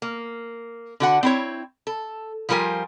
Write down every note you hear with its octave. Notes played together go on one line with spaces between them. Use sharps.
A#3
D3 F#4 F#5
C4 E4 C#5
A4
F3 G3 F4 A#4 G#5